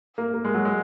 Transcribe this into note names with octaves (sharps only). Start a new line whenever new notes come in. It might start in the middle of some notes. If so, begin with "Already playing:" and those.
A#3
A#3
G#3
F#3
G#3